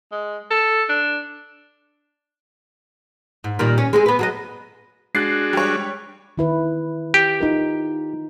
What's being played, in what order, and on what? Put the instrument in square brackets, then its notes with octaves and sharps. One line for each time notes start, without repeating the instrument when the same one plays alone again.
[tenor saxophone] G#3
A4
D4
[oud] G#2
A#2 D#3 G3
C#4
G#3 C4 G#4
B3 B4
F#3 G#4 D#5
[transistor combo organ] G#3 D4 F#4 [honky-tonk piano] F#6 A6 C7
[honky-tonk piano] G3 C#5
[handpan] D#3 E4 B4
[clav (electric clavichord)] G4
[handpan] D#4 F4 A#4